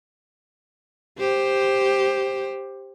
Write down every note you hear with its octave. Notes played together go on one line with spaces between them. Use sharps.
G4 C5